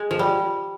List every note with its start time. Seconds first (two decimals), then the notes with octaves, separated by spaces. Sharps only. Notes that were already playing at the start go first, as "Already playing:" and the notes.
Already playing: G#3
0.11 F3
0.19 G3